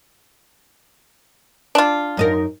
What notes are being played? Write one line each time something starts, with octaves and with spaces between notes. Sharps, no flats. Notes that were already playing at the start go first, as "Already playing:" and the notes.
D4 F4
F#2 D#4 A#4